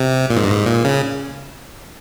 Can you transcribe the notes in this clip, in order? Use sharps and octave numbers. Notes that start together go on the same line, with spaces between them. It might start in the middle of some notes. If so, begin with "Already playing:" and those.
Already playing: C3
A#2
G#2
G2
G#2
A#2
C#3